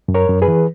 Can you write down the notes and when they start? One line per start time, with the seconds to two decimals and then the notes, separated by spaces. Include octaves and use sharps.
0.08 F#2
0.14 A#4 C#5
0.29 F#2
0.42 G#4 B4
0.48 E3